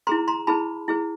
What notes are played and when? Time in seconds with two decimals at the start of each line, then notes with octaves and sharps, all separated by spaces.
0.07 E4 G#4 B4 A#5 C6
0.28 A#5 C6
0.47 E4 G#4 B4 A5 B5
0.88 E4 G#4 B4